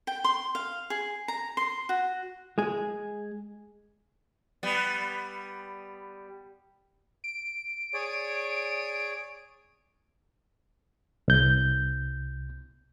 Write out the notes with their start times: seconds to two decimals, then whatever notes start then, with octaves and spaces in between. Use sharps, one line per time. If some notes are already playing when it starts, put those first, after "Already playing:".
0.07 G5
0.24 C6
0.55 F5
0.90 G#4
1.28 A#5
1.57 C6
1.89 F#4
2.58 G#3 G#4
4.63 G3 B3
7.24 D7
7.94 G#4 C#5 D5
11.28 C2 G6